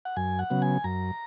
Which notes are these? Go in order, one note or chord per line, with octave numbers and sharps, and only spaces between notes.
F#5
F#2 G#5
F#5
C#3 F#3 B3
G#5
F#2 A#5